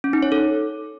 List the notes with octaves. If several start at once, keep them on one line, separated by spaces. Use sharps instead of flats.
C#4
D#4
C#5
A4